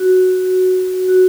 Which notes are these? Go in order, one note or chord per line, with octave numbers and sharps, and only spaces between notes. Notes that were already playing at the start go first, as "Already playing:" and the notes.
Already playing: F#4
F#4